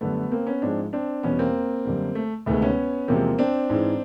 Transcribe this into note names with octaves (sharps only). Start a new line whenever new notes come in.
F#2 D3 G3 A3 B3
A#3 C4
B3 C#4
G#2 F3 G#3 C4 D4
C4 D4
E2 B2 G3 B3 C#4
A#3 C4
F#2 D3 G3
A3
D2 C3 D#3 G#3 A3 B3
B3 C#4
E2 C3 F3 G#3 A#3 C4
C4 D4
G#2 E3 G#3